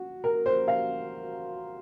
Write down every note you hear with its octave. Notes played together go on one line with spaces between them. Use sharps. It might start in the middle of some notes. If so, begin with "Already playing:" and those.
Already playing: F#4
A#4
C5
F5